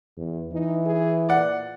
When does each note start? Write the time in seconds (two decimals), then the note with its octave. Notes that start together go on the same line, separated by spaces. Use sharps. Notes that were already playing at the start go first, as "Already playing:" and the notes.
0.17 E2
0.52 E3 D#4
0.85 G#4
1.29 A#2 D5 F#5